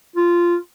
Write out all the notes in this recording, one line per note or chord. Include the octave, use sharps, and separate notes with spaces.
F4